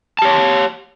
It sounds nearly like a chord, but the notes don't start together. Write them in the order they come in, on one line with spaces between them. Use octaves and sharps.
A5 G4 C#5